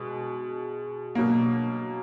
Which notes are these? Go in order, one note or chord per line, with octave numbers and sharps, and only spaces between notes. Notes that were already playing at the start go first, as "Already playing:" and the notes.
Already playing: B2 G#3
B2 F#3 A#3